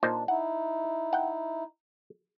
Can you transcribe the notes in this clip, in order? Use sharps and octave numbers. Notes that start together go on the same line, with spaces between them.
A#2 D4 D#4 C5
D#4 E4 F#5
F#5 G5